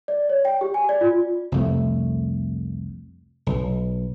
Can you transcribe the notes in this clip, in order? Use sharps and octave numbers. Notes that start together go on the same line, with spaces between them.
D5
C#5
G5
G4
G#5
D5
F4
C2 F2 A3
B1